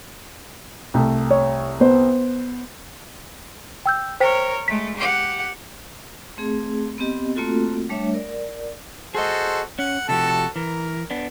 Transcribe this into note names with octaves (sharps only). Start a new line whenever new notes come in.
C2 A3
C#5
B3 C5
G5 E6 G6
A#4 C5 C#5 G5 B6
G#3 A3 B6
G4 F#5
A3 C4 G#4
B3 C4 G4 D#5
A3 A#3 C4 F4 F#4 A4
G3 A3 D4 C#5 E5
A#4 D5
F#4 G#4 A4 C5 D#5
C#4 F#5
C3 F3 F#4 G4 A4 A5
E3 A#4
B3 D4